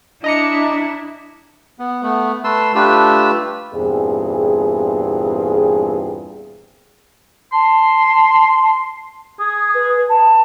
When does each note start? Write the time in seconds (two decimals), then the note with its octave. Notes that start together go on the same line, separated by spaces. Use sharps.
0.24 D4 E4 D#5 A#5 D6 C#7
1.79 B3
2.03 A3 B3
2.44 A3 B4 A5 C6 E6
2.75 A3 D4 F4 G4 B4 E6
3.74 E2 G2 A#2 C4 G#4
7.53 A5 C6
9.39 G#4 D#6
9.74 B4
10.09 A5